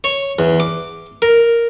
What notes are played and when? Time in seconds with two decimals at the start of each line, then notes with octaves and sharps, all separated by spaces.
0.04 C#5
0.39 E2
0.60 D6
1.22 A#4